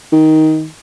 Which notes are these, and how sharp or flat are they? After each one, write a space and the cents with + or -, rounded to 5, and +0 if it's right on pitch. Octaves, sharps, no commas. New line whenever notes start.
D#3 +10